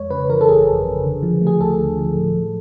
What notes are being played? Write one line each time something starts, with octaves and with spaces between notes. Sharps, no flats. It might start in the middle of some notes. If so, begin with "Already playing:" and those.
Already playing: F2 G#3 C#5
C#3 B4
E3 A#4
A4
G1 G#4
F2
C#3
D3
F3
A3
G#4
D2 A4
D3
F3
A2
F3